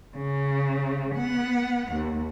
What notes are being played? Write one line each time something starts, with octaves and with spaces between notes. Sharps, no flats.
C#3
B3 F#5
D#2